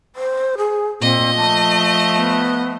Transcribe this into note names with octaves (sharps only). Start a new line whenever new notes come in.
C5
G#4
A#2 C4 D#5
F3 A3 A5
B3